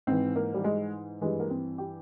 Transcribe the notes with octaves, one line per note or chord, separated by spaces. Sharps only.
G#2 E3 C4
A#3
G3
G#3
G2 E3 G#3
A#3
C4
G4